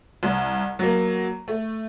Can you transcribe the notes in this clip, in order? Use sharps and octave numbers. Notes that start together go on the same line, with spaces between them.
C2
F#3 A#3
A3